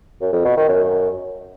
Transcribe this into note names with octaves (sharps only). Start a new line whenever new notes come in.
F#2
F2
B2
D#3
F#2